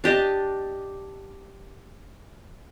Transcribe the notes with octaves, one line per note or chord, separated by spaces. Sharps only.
D4 G4 D#5 A5